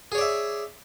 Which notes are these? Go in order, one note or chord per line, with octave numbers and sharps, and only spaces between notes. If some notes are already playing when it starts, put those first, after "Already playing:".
G#4 C#5 D5 E5